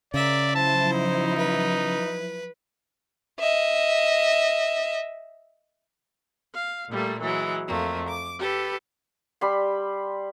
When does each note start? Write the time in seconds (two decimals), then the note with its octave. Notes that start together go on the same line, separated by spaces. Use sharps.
0.14 C#3 A#4 D5 E5
0.55 F3 F#3 E4 C5 A5
0.93 D#4
1.37 B4
3.40 D#5 E5
6.54 F5
6.90 A#2 G3 A3 A#3
7.20 E3 F#3 G#3
7.68 F2 A3 A#3
8.09 D6
8.39 G4 A4 B4
9.41 G3 B5 C6